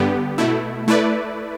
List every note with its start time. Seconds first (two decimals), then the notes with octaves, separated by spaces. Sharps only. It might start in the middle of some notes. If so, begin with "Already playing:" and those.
Already playing: G2 D3 B3 G4
0.38 B2 A3 E4
0.88 A3 E4 B4 D5